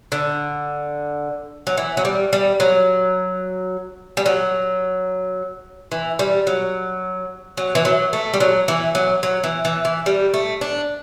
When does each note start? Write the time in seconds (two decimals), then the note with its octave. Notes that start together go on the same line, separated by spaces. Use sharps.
0.12 D3
1.67 F#3
1.77 E3
1.97 F#3
2.05 G3
2.33 G3
2.60 F#3
4.17 G3
4.26 F#3
5.92 E3
6.19 G3
6.47 F#3
7.57 F#3
7.75 E3
7.85 F#3
8.13 A3
8.34 G3
8.40 F#3
8.68 E3
8.95 F#3
9.23 F#3
9.44 E3
9.65 E3
9.85 E3
10.06 G3
10.34 A3
10.61 D4